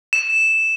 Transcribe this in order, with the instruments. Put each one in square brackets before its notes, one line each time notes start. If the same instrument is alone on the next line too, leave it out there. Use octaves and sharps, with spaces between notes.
[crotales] E7